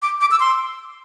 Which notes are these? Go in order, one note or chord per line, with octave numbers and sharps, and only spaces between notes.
D6
D6
E6
C6